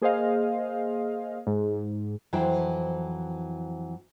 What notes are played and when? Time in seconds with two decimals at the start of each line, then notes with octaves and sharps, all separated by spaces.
0.01 A#3 G#4 C5 D#5 F5
1.47 G#2
2.33 F2 E3 F#3 E4 C5 G5